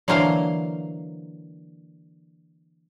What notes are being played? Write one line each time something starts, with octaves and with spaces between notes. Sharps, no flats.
D3 E3 F#3 A#3 C5 F5